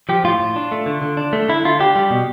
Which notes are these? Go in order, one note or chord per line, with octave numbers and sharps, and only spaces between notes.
F3 G4
A2 F4
A2
D4
A3
D3
D3
D4
A3
D3 E4
D3 F4
D4 G4
G3
B2